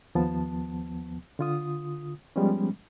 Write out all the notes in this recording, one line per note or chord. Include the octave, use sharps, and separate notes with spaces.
D#2 F3 B3 A5
D3 F4 D#6
F3 G3 G#3 B3 C#4